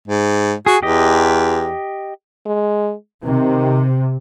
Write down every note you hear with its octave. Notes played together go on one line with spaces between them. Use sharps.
G#2
F#4 G#4
E2 G4 D#5
G#3
C3 D#3